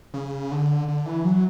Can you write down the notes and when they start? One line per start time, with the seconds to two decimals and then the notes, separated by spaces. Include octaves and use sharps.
0.14 C#3
0.51 D3
0.88 D3
1.06 E3
1.25 F#3